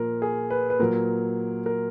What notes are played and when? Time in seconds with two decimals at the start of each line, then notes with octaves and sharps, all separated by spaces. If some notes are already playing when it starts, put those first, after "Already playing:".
Already playing: A#2 F3 A#4
0.22 G#4
0.50 B4
0.70 B4
0.79 A#2 F#3 A#4
1.66 A#4